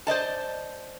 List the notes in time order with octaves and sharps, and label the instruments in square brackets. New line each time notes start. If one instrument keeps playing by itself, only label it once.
[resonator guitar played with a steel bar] C5 D5 D#5 A5